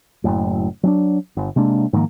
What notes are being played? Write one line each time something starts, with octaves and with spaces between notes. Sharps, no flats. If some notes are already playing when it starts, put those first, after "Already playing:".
F#1 F#2 A2
F#3 C#4 D4
G1
C3 G#3 A#3 D4
G#2 D#3 F3 A#3